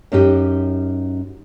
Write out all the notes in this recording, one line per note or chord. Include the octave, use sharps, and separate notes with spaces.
F#2 C#4 D#4 G4